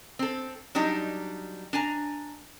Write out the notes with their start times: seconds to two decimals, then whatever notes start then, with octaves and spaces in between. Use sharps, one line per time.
0.19 C4 A4
0.75 F#3 G3 D4 D#4 D5
1.73 D4 G#5 A#5